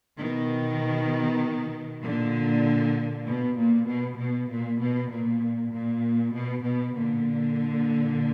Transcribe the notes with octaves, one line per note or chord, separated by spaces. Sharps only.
B2 D#3
A#2 D3
B2
A#2
B2
B2
A#2
B2
A#2
A#2
B2
B2
A#2 D3